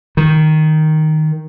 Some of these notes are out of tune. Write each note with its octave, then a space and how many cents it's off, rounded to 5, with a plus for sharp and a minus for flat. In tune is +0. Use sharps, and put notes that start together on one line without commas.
D#3 +0